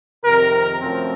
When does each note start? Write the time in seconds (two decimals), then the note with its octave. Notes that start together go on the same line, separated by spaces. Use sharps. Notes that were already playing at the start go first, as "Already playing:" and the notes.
0.25 F2 C3 D#3 A#4
0.80 F#2 F3 A3 C4